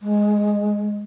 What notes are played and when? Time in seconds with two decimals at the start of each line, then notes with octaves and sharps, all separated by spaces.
0.01 G#3